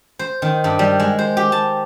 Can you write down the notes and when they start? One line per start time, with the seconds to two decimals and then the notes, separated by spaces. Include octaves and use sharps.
0.19 C5
0.42 D#3
0.64 G2
0.79 G3
1.00 G#3
1.19 C5
1.37 G4
1.52 A5